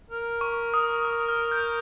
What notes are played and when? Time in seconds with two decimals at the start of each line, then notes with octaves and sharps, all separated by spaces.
0.10 A#4
0.41 C#6
0.74 D#6
1.05 D#6
1.29 F6
1.51 G6